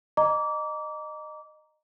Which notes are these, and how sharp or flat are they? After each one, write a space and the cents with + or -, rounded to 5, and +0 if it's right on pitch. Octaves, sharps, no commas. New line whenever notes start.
D#5 -20 A#5 +0 D6 -25